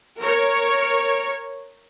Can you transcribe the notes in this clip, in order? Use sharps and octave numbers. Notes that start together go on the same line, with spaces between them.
A#4 C#5